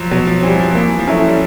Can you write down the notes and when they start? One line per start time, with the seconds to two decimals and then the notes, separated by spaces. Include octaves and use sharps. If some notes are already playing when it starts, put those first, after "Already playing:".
Already playing: F3 F#3
0.11 B2 F#3
0.27 F3
0.43 E3 G3 C4
0.60 F3
0.71 F3
0.75 E3 A#3
0.98 F3
1.07 F#3 C#4 E4 A4
1.28 G3